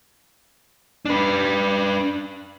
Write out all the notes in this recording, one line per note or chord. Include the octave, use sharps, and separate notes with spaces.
D4 B4